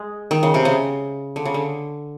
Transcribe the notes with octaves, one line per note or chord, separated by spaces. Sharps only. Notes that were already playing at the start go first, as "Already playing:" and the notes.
Already playing: G#3
D#3
C#3
C3
C#3
D3
C#3
D3